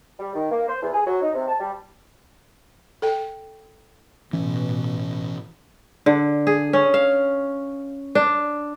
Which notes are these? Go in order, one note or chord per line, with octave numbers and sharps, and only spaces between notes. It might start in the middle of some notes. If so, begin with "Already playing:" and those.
G3
D#3
A#3
C5
E2
G#4
F#3
D#4
C3
A5
G3
A4 G5
A1 B2 E3 C#4
D3
G#4
C#4
F5
D4